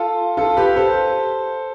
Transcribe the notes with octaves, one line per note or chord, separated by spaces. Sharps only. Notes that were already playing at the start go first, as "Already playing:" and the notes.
Already playing: F4 A4
F4 A4
G4 B4
A4 C5